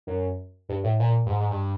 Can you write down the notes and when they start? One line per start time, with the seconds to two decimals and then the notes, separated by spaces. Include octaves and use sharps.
0.07 F#2
0.69 G2
0.84 A2
1.00 A#2
1.26 G2
1.30 G#2
1.40 G#2
1.51 G2